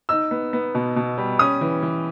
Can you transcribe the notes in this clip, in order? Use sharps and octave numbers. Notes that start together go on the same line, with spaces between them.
D#4 E6
B3
B3
B2
B2
G3
C#4 D#6
E3
E3